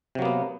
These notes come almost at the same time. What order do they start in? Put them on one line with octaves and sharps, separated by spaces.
C3 F#3 A#3 B3